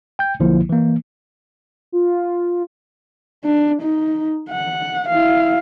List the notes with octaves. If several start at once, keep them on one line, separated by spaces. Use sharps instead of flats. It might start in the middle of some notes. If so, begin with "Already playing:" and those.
G5 G6
B1 D3 F3 A#3 E4
E3 A#3
F4
D4
D#4
F#5
E4 F5